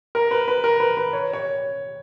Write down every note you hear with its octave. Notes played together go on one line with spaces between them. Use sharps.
A#4
B4
B4
A#4
B4
B4
C#5
C#5